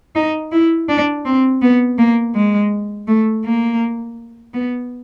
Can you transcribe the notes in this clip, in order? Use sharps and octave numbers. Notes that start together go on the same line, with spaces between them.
D#4
E4
D4
C4
B3
A#3
G#3
A3
A#3
B3